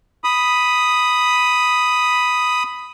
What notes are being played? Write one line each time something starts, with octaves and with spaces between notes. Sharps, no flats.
B5 D#6